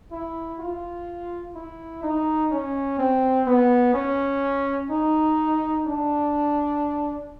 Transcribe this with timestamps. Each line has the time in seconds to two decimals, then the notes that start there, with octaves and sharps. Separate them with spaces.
0.11 E4
0.59 F4
1.55 E4
2.03 D#4
2.51 C#4
2.99 C4
3.46 B3
3.94 C#4
4.90 D#4
5.86 D4